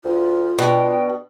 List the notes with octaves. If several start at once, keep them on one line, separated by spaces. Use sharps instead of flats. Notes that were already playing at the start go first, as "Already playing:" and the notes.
D2 F4
B2 D4 G5